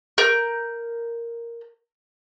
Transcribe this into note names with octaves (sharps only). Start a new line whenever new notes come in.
A#4 G6